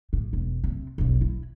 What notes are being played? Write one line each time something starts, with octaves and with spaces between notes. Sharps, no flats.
A2
E1
C3
E1 B1
E4